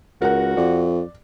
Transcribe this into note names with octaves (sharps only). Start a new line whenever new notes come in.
C#2 F#4 A#4 F#5
F2 D5